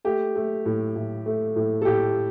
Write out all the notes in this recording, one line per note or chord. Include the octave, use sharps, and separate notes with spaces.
A3 G4
A3
A2
A2
A3
A2
A4
A2 G4